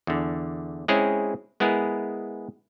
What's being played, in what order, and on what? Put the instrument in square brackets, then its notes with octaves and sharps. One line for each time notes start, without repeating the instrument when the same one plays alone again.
[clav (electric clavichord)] E2 D3
G#3 C4 C#4 E4 G#4 C#5
G#3 B3 E4 G#4 A#4